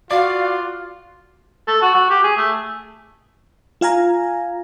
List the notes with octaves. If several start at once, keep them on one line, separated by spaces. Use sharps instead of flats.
F4 F#4 D5 F5
A4
F#4
F#4
G4
G#4
A3
F4 F5 G#5 A#5